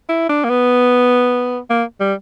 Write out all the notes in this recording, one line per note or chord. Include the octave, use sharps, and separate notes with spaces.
E4
D4
A#3
B3
A#3
G3